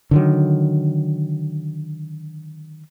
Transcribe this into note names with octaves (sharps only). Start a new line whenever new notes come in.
D3 D#3 F#3